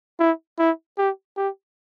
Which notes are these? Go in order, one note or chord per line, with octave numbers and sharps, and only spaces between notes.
E4
E4
G4
G4